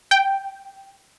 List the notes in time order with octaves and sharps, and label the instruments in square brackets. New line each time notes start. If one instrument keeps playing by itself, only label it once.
[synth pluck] G5